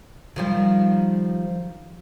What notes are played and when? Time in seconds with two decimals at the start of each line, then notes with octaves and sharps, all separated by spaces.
0.36 D#3 F3 G3